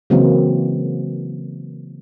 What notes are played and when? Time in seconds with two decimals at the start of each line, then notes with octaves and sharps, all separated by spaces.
0.10 C#3 E3 F#3 G#3 A#3 C4